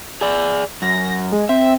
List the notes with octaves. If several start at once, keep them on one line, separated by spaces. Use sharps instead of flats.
G#4 D5
F#2 A#6
G#3
C4 E5